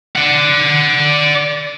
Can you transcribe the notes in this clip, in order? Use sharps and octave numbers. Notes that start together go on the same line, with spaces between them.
D5 F#5